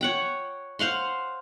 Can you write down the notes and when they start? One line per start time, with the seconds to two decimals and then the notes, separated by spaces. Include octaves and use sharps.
0.01 C#5 F#5 G5
0.79 C5 F5 F#5 C6